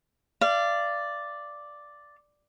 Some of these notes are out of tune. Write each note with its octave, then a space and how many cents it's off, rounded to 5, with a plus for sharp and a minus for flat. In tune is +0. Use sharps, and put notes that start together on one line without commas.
D5 +0 F5 -30